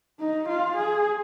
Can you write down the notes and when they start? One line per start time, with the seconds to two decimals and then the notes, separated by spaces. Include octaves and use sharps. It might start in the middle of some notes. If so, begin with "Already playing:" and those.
0.20 D#4
0.49 F4
0.76 G#4